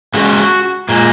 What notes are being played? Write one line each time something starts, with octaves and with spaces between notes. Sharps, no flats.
C#3 G#3 F#4
A#2 G#3